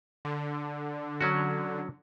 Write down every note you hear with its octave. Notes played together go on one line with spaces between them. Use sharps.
D3
F#3 C#4 F#4